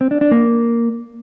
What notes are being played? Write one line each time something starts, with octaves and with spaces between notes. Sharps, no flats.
C4
D4
D4
A#3